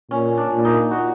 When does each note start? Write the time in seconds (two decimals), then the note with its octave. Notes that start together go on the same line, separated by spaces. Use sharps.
0.11 A#2 C#4
0.37 D4
0.51 A#2
0.65 D#4
0.91 F#4